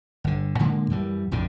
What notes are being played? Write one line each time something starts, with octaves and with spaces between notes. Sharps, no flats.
G1 D3
A#2 D3 G#3 A#3
F#2 E3 G3
A#1 F2 A2 D3